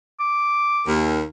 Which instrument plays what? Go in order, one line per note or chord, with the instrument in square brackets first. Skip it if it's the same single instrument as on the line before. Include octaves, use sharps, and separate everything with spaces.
[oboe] D6
[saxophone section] D#2